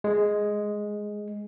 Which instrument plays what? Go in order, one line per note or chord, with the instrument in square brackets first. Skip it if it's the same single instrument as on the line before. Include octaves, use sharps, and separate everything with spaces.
[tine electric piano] G#3